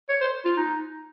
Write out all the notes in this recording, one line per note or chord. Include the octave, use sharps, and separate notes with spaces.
C#5
C5
F4
D#4